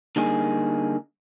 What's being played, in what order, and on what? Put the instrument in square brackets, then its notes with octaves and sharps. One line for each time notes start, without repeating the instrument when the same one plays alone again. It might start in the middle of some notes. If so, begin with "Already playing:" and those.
[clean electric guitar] D3 G3 A#3 D#4 G#4